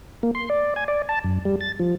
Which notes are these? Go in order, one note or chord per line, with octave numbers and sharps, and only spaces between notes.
A#3
C6
D5
G#5
D5
A5
F#2
G3
A6
F3